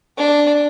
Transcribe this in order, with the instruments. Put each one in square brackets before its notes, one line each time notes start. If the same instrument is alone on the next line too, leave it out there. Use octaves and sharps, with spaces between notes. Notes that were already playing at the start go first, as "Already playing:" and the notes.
[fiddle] D4